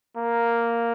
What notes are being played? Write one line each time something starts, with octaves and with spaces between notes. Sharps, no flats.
A#3